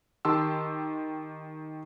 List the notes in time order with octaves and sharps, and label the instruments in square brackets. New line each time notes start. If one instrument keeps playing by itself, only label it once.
[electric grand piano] D#3 G4 A5 C6 E6